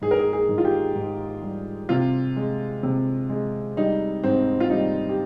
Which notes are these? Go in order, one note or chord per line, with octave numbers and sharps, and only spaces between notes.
G#2 G#4
A#4
G#4
G#4
G#2
F4
G4
G#2
G3
C3 F4
G#3
C3
G#3
G3 D#4
G#2 C4
F4
G3 D#4
G4